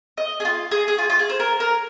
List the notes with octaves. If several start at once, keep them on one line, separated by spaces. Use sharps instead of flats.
D#5
G#4
F4
G#4
G#4
F4
F4
G#4
C5
A#4
A#4